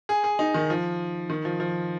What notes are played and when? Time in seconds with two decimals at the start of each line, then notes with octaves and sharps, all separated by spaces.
0.09 G#4
0.24 G#4
0.39 D#4
0.54 D#3
0.70 F3
1.30 D#3
1.45 F3
1.60 F3